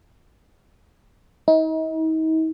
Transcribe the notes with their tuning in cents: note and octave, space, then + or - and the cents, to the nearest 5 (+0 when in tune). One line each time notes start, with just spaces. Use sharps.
D#4 +40